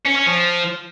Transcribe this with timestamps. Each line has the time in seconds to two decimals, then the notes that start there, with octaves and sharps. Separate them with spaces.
0.06 C#4
0.16 C#4
0.26 F3